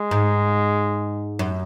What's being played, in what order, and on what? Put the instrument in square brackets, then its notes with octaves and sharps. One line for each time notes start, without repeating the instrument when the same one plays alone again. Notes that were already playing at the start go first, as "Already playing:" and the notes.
Already playing: [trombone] G#3
[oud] G#2
F#2